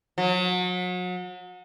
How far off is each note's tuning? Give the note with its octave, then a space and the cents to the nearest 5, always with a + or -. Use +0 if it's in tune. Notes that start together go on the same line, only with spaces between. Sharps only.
F#3 -35